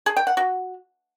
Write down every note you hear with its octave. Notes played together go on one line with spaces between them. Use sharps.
G#4
G5
F#5
F#4